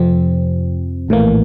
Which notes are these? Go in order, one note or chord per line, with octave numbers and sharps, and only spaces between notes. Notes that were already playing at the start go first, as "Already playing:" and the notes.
Already playing: F2 C3 F3 C4
A#1 A2 E3 A#3